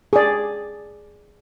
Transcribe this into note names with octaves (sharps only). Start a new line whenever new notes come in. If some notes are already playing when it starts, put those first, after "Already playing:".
G#4 D5